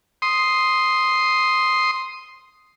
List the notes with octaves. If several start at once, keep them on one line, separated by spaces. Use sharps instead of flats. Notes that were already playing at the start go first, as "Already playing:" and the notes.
C6 D#6